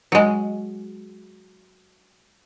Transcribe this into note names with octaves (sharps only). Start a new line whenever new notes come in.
F#3 G#3